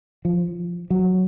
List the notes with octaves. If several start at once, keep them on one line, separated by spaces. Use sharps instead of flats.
F3
F#3